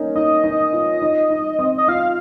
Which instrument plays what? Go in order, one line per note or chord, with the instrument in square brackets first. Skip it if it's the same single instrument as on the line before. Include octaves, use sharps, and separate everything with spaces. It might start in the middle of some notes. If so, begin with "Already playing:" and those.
Already playing: [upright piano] A#3 C#4 D#4
[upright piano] D#4 [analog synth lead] D#5
[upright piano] D#4
F4
D#4
D#4
C4
[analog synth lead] D#5
[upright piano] F4 [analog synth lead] F5